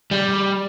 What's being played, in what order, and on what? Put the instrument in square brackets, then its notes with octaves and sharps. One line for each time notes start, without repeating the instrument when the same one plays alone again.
[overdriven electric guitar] G3